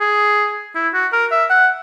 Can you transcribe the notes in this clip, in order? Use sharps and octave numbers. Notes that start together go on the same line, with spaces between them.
G#4
E4
F#4
A#4
E5
F#5